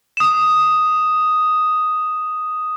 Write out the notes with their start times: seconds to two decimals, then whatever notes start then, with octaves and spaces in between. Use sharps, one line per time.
0.17 D#6 E7